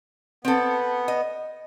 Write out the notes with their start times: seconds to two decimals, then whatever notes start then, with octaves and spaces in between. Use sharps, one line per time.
0.45 B3 C4 A4
1.08 D#5